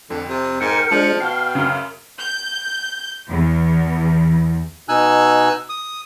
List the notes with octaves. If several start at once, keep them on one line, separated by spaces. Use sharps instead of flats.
F2 D3
C3
G#2 A#4 G5 C#7
F3 G#3 D4 A5 F6
B2 F5 G5
F#2 C#3
G6
E2
B2 D#4 G#5 E6 F#6
D#6